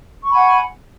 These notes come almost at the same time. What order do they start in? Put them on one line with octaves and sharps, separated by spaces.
C#6 B5 G#5 F#5